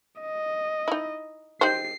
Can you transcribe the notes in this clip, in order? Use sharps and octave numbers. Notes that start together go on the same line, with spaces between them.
D#5
D#4 E4
D#4 G4 C5 C7